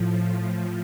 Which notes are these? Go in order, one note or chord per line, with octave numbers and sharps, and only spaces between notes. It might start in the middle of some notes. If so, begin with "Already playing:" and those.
Already playing: A2 F3